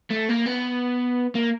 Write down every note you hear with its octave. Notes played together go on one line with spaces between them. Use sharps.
A3
A#3
B3
A#3